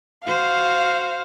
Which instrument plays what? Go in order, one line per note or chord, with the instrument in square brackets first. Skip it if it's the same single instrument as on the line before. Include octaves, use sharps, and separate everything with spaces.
[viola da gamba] F#4 C5 [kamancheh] F5